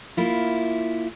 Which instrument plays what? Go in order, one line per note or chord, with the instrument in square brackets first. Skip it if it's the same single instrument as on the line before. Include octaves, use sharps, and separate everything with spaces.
[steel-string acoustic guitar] A#3 E4 F4